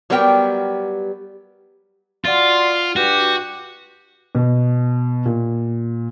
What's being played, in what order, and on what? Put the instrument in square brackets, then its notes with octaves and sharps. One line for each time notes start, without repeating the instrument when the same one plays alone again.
[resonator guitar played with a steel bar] F#3 G3 B3 G4 A#4 G5
[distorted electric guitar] F4 [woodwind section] F#4 D5 C6
[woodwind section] G2 D4 G4 [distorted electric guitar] F#4
[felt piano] B2
A#2